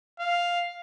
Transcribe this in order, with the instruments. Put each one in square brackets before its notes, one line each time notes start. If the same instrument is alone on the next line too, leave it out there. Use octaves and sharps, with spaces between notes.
[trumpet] F5